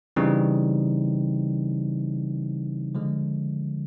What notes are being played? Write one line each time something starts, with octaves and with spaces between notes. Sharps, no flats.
C#3 E3 G3 C4 D#4
D3 F3 G#3